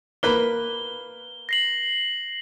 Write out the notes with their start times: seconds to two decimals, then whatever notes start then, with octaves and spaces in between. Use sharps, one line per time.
0.23 A#3 B4 B5 G7
1.49 A#6 C7 F#7